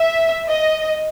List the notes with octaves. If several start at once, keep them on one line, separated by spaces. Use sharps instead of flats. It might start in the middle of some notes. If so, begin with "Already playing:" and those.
Already playing: E5
D#5